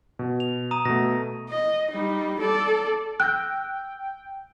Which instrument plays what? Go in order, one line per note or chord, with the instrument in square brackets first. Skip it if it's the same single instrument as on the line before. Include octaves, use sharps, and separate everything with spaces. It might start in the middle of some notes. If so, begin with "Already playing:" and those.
[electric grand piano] B2
[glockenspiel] F7
A#5 D#6 D#7
[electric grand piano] B2 A3 [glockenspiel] A#6
[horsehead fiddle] D#5
G3 D#4
A4 D5
[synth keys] G5 [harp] E6 G6 A#6 [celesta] F#6